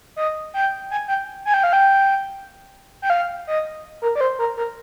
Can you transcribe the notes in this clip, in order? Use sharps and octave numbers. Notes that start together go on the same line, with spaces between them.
D#5
G5
G#5
G5
G#5
G5
F5
G5
G5
F5
D#5
A#4
D5
C5
A#4
A#4